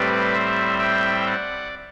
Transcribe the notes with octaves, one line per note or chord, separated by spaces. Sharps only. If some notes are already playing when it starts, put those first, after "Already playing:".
Already playing: A2 G3 C4 B4 D5
C5 E5
E5 G5
D5 F#5